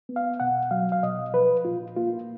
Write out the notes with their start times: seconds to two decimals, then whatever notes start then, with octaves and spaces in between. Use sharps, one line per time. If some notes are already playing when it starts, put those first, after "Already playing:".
0.09 B3
0.16 F5
0.40 B2 F#5
0.71 F#3 F5
0.92 F5
1.03 B2 D#5
1.33 F3 B4
1.65 A#2 F4
1.97 A#3 F4